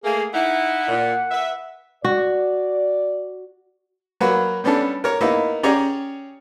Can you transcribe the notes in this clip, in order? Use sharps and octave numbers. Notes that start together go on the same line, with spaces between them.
A3 A#3 G#4
D#4 E4 F#5
A#2
B4 E5
F#4 D5
F#3 A#3 F#4 B4
G3 B3 C#4 D4 A4
A#4 C#5
A#3 B3 D#4 E4
C#4 G4 G#4 C#5 D5 A#5